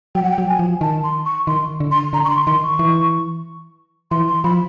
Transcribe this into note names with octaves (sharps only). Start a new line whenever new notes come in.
F#3 G5
F#5
G5
F#3
G#5
F3
D#3 A5
C6
C#6
D#3 C6
D3
C6
D3 A#5
C#6
C6
D#3 C6
C#6
E3
E3 C6
C6
F3 B5